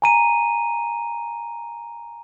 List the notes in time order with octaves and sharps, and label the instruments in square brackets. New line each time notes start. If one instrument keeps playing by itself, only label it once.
[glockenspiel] G#5 A#5 D#7